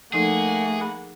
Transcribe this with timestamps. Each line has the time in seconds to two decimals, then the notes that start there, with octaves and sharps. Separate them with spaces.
0.13 F3 A3 A#3 D#4 G#4 A4 F#5
0.81 G#4 B5